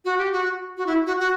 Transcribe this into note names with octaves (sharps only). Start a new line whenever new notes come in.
F#4
G4
F#4
F#4
E4
F#4
F#4